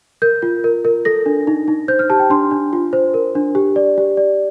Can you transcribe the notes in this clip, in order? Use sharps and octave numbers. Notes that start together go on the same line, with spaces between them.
A#4 G6
F4
A#4
A#4
A4 A#6
D4
D#4
D#4
C5 G6
F6
G4 A5
G5
D4 C6
D4
F4
C5
A#4
D4
G4
D5
G4
D5